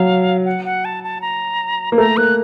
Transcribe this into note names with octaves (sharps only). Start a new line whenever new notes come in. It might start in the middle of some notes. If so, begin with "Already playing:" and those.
Already playing: F#3 F5
F#5
F#5
A5
A5
A#5
A#3
A3 A#5
A#3 F#6